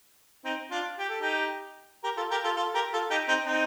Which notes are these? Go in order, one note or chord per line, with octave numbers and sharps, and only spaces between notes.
C4 D#4
D4 F4
G4
A4
D#4 G4
G4 A#4
F4 A4
G4 A#4
F4 A4
F4 A4
G4 A#4
F4 A4
D#4 G4
C4 D#4
C4 D#4